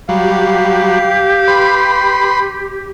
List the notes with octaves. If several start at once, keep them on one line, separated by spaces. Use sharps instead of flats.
F#3 G3 G4 F5
B4 B5 C6